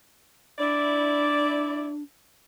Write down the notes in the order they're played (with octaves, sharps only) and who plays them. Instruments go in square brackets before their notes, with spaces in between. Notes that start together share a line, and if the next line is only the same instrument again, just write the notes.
[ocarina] D4 [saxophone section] E4 D5